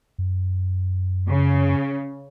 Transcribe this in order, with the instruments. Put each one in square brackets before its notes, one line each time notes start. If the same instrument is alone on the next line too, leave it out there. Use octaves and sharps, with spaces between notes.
[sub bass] F#2
[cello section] C#3